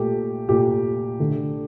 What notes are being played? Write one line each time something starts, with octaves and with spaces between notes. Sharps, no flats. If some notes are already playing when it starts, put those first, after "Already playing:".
Already playing: A#2 A3 G4
A#2 A3 G4
D3 A3